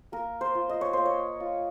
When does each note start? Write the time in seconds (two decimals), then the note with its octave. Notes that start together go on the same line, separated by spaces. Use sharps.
0.12 A#3 A#4
0.41 C5
0.55 F4
0.69 D#5
0.81 C#5
0.93 A#3 C5
1.05 C#5
1.40 F4